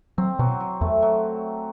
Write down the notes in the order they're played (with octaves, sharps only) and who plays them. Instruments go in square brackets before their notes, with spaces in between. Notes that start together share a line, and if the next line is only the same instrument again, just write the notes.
[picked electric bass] F#3 [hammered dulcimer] C4
[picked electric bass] B2 [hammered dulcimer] F#3
[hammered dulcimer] F#3
[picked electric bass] E2 [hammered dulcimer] A3
[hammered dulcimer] F#3